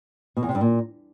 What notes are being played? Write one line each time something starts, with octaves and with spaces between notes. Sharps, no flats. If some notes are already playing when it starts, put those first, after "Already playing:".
B2
E2
C3
G2
A#2